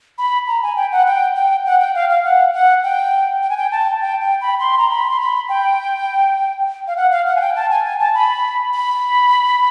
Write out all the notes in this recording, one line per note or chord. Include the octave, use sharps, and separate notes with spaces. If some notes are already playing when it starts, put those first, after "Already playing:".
B5
A#5
G#5
G5
F#5
G5
G5
F#5
G5
F5
F5
F#5
F#5
G5
G5
G#5
G5
A5
G5
G5
B5
C6
A#5
B5
C6
B5
G5
F5
F#5
F5
F#5
G#5
G5
A5
G#5
G#5
A5
B5
B5